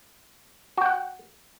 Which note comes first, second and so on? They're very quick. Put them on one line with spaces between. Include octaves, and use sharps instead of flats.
F#4 G5 F#5